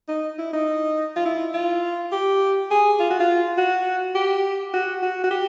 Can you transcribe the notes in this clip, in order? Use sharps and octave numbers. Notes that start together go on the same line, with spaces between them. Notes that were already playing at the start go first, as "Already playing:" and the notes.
D#4
E4
D#4
F4
E4
F4
G4
G#4
F4
F#4
F4
F#4
G4
F#4
F#4
F#4
G4